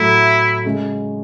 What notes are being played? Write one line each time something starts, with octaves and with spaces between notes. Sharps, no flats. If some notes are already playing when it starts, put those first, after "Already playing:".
Already playing: A2 F#3 A3 E4
C#3 G#3 C#4